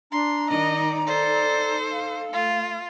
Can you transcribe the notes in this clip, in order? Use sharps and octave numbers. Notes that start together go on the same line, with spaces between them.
D4 A#5 C6
D#3 D#4 D5 D#5
D#4 A4 C5 D5
F5
A3 F4